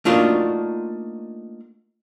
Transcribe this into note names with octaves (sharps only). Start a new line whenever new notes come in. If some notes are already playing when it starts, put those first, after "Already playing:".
A3 A#3 D4 D#4 F4 F#4